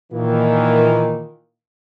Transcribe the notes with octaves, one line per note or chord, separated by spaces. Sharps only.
A#2 D#3 E3 A#3